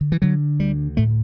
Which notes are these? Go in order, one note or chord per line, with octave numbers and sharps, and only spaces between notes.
D3
E3
D3 F#3
D2 G3
A2 A3